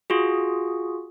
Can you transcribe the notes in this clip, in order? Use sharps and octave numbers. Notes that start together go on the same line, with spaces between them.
F4 F#4 G#4